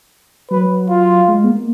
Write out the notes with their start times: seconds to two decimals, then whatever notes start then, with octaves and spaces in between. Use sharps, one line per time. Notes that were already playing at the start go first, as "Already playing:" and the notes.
0.51 F#3 B4
0.90 F4
1.28 G#3
1.44 B3
1.49 A#3